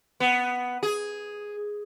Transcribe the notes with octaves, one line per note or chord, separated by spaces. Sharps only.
B3
G#4